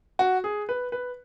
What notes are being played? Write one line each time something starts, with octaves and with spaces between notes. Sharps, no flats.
F#4
G#4
B4
B4